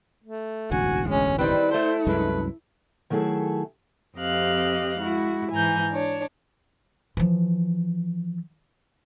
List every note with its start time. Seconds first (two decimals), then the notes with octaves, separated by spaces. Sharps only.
0.24 A3
0.71 E1 A1 D2 F#4 G#5
1.09 G#3 C#4
1.39 D#3 G3 C4 E4 B4
1.71 A3 A4 C5
2.07 C2 F#2 G#3 B4
3.10 D#3 F#3 A3 E4 G#4 A4
4.17 F2 C4 G4 D#5 F5 F#6
5.00 G#3 E4 F#4
5.52 G#2 E3 G#5 A#5 G6
5.92 D4 C#5
7.17 E3 F3